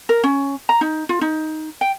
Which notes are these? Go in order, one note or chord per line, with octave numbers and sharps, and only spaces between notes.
A#4
C#4
A#5
D#4
F4
D#4
G5